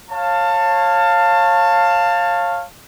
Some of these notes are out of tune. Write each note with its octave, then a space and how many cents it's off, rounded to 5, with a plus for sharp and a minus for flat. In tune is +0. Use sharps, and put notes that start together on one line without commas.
C#5 -20 F5 +0 A5 +20